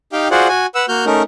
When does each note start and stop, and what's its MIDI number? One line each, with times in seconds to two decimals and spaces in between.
0.13 0.28 63
0.13 0.28 67
0.13 0.28 77
0.13 0.28 79
0.31 0.48 65
0.31 0.48 66
0.31 0.48 68
0.31 0.48 72
0.31 0.48 74
0.31 0.48 78
0.48 0.66 66
0.48 0.66 80
0.75 0.86 71
0.75 0.86 78
0.75 0.86 88
0.88 1.05 58
0.88 1.05 66
0.88 1.05 89
0.88 1.05 91
1.06 1.22 57
1.06 1.22 61
1.06 1.22 63
1.06 1.22 70